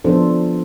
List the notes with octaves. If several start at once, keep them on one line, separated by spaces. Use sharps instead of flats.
F3 B3 D4 A4 C5